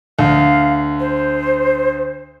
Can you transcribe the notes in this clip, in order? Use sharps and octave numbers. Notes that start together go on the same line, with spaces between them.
D2 F5
C5